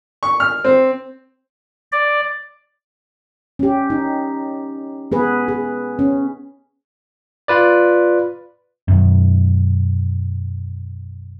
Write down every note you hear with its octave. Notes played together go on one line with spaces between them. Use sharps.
C#6
F6
C4
D5
C#4 G4
D#4
B3 G#4 B4
G#4
C#4
F4 B4 D5
B1 F#2